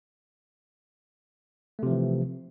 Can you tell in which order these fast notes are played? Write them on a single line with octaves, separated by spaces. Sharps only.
A3 C3 F3 E3